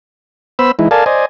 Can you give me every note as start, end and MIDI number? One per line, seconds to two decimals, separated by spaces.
0.59 0.71 59
0.59 0.71 72
0.59 0.71 83
0.59 0.71 88
0.79 0.88 52
0.79 0.88 56
0.79 0.88 63
0.79 0.88 64
0.91 1.04 69
0.91 1.04 70
0.91 1.04 74
0.91 1.04 77
0.91 1.04 80
0.91 1.04 81
1.06 1.25 72
1.06 1.25 74
1.06 1.25 75
1.06 1.25 80